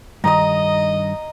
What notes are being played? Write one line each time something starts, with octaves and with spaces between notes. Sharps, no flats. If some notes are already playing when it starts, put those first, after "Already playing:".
G2 D#3 D#5 A#5 D#6